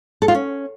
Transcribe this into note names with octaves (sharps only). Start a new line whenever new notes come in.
A4
F4
C#4